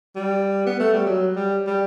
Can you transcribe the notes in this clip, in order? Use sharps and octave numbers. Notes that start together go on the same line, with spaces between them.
G3
B3
A3
G3
F#3
G3
G3